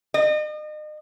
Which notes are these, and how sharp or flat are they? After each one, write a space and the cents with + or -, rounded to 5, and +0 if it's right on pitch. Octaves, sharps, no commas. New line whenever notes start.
D#5 -40